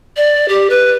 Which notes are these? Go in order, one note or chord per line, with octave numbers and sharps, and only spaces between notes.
D5
G4
B4